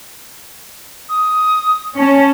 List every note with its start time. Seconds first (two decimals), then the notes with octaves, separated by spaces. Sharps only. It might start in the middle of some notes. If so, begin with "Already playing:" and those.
1.09 D#6
1.98 C#4 A5